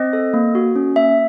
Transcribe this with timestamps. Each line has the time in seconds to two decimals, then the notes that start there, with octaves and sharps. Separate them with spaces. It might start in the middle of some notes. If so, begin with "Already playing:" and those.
Already playing: C4 D#5
0.13 A4
0.34 A#3
0.55 F#4
0.76 C#4
0.96 A#3 E5